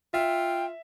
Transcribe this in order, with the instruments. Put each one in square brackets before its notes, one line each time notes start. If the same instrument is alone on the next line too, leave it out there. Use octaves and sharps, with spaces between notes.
[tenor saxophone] F4 [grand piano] E5 [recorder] G5